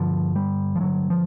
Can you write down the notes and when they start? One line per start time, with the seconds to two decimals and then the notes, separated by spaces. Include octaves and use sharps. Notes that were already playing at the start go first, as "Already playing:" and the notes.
Already playing: G2 D3 F3
0.35 G3
0.76 F3
0.80 G2 D3 F#3
1.10 F3